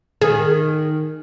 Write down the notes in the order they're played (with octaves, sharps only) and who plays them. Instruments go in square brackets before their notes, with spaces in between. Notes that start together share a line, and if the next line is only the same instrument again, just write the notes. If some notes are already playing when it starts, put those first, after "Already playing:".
[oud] D#3 [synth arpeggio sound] G#4